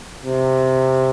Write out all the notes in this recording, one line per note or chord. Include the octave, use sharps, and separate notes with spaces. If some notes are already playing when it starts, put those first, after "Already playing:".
C3